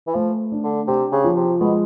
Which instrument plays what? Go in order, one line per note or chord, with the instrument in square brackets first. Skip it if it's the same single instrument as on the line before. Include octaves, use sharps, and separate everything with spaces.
[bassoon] E3
[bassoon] F3 [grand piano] A3
[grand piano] D4
[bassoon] D3
[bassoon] C3 [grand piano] G4
[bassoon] C#3
[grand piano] F3
[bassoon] C3
[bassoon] B2 [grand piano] G#3